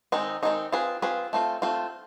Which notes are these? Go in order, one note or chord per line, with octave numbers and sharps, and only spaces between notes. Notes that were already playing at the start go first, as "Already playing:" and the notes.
D#3 G#3 C4 D#4
D#3 G#3 C4 D#4
C4 F4 G#4 B4
C4 F4 G#4 B4
A3 C4 F4
A3 C4 F4